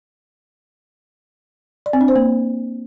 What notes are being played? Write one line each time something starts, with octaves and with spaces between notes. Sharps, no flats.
D5
C4
D4
C5
A#3